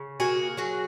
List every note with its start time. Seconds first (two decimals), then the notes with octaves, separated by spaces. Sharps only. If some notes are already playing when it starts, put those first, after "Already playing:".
Already playing: C#3
0.20 A#3 F#4 G#4
0.57 F#3 F#4 G#4